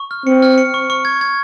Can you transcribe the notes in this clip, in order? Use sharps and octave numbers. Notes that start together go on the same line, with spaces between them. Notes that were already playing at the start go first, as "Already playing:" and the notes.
Already playing: C#6
F6
C4 C#7
F6
C#7
C#6
C#6
G#6
G#6